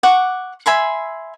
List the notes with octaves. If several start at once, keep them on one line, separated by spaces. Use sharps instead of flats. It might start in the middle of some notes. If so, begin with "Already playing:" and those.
F#5 C#6 D6
E5 G#5 B5 C6